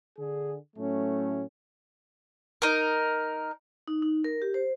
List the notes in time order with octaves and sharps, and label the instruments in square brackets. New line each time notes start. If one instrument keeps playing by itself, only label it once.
[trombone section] D3 G#4
A2 F#3 A3 C#4
[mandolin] D#4 A#4
[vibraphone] D#4
D#4
A#4
G4
C5